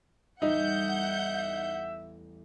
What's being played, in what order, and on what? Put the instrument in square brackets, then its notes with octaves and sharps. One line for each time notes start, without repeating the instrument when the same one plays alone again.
[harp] A1 E2 G3 [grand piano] D#4 [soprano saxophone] E5 [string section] F#5 G6